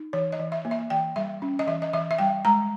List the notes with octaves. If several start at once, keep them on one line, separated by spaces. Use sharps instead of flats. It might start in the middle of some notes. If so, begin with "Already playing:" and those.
Already playing: D#4
E3 C#5
D#5
E3
E5
A#3
E5
E3 G5
G3 E5
C#4
D#5
E3 E5
D#5
E3 E5
E5
G3 G5
G#3 A#5